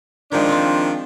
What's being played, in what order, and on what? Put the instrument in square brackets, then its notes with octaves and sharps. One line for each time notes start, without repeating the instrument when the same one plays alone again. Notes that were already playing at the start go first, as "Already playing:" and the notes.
[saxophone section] D#3 F3 D4 [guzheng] G#3 G4
[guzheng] C4 F4